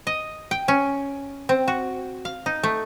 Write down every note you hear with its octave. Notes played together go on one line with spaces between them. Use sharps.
D#5
G5
C#4
C4
F#4
F5
D#4
A3